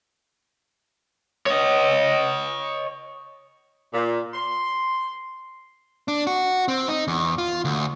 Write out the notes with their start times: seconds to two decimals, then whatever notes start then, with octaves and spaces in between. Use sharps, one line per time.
1.46 C#5 D#5
3.93 A#2
4.34 C6
6.08 D4
6.27 F#4
6.68 C4
6.88 D#4
7.08 E2
7.38 F4
7.65 D2